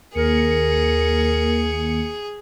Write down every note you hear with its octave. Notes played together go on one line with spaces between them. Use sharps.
D#2 A#3 G#4 A#4 C#7